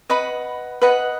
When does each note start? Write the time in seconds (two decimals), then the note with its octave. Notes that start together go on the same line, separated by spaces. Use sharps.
0.10 B4 D#5 F#5 B5
0.82 B4 D#5 F#5 B5